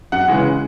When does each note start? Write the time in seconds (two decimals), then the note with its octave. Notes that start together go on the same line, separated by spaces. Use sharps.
0.12 F#2 F#5
0.28 C#3 E3 G#3